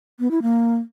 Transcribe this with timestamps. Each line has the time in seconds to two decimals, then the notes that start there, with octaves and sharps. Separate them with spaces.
0.20 B3
0.31 E4
0.42 A#3